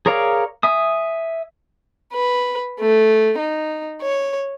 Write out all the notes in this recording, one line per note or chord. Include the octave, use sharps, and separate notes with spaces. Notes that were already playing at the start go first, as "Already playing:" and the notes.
G#4 A#4 C#5 D5 F5
E5 G#5 D#6
B4
A3
D#4
C#5